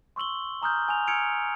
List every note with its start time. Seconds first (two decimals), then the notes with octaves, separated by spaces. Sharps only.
0.16 C6 C#6 E6 F#7 G7
0.62 G#5 A#5 D#6 F6 G6
0.88 G#5 F7
1.07 E6 F6 G#6 C#7 D7 F7